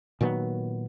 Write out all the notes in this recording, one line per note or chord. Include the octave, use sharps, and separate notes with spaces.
A#2 D#3 F#3 B3